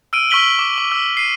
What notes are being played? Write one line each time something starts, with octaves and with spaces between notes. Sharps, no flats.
E6 F6 D7 D#7
C#6 E6 F6 B6 F#7 G7
D6
D6
E6
C7 D#7